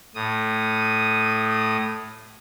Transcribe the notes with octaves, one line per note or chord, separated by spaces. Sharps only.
A2 D#6